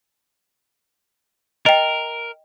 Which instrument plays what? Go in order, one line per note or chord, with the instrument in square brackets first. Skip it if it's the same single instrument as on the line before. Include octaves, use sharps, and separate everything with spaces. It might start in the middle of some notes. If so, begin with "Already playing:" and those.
[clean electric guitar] A#4 [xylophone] D#5 G5